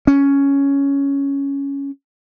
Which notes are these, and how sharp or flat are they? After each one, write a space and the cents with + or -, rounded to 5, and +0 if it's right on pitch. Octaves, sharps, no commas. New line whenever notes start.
C#4 +5